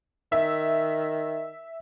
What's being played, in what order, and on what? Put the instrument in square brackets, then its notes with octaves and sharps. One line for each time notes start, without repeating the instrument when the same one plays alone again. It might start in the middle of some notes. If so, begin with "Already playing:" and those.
[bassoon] D#3 [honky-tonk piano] E5